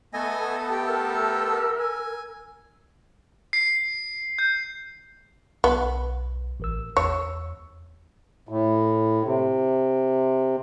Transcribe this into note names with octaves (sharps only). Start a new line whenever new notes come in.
A3 B3 A4 D#5 G#5
G4 G5
A#4 E6
G#5
C7
G6
B1 B3
A1 A#4 E6
E2 C#5 E6
A2
C3